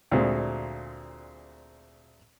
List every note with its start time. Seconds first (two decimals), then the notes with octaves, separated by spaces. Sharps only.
0.11 D2 A#2 G#3 C4